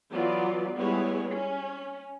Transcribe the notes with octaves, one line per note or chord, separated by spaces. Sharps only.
E3 F#3 B3 F4 D5
G3 G#3 B3 E4 C#5
C#4